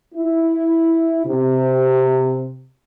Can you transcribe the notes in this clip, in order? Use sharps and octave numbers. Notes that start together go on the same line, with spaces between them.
E4
C3